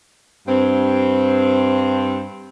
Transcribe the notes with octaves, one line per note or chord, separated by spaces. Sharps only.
G2 C4